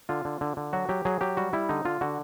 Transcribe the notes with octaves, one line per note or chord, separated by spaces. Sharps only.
D3 F4
D3
D3
D3
F#3 F#4
F#3 G4
F#3 G#4
F#3 G4
G3 F#4
G3 E4
D3 D#4
D3 F4
D3 F#4